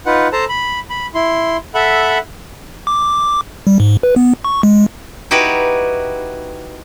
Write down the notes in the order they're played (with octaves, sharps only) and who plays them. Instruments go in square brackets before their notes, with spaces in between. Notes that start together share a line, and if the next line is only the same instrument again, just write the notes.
[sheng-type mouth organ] D#4 F4 B4 F#5
A4 C5 A5 A#5
B5
B5
E4 C6
A4 E5 F#5 B5
[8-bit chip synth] D6
G3
G#2
B4
B3
C#6
G#3
[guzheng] D#4 E4 F#4 G4 B4